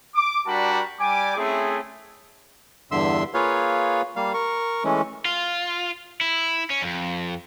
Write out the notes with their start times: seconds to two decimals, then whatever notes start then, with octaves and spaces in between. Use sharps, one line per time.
0.13 D6
0.46 G3 D4 F#4 A#4 A5 B5
1.00 G3 G#5 D6
1.37 A3 C4 C#4 E4 G#4
2.91 E2 G2 D3 E5 C6 E6
3.34 A#3 F4 G#4 B4 C#5 F5
4.16 G3 A#3 F5
4.34 A#4 C#6
4.84 E3 G#3 A3 C#4
5.26 F4
6.21 E4
6.70 C#4
6.82 F2